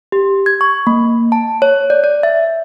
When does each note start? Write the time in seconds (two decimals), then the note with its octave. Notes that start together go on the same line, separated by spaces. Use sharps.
0.12 G4
0.46 G#6
0.61 C#6
0.87 A#3
1.32 A5
1.62 C#5
1.90 D5
2.04 D5
2.23 E5